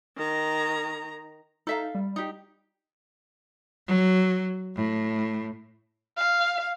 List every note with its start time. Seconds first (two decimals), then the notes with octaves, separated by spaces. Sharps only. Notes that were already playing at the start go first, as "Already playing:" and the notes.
0.16 D#3 A#5
1.67 D#4 A4 E5 F5
1.95 G3
2.16 D#4 G4
3.86 F#3
4.75 A2
6.17 F5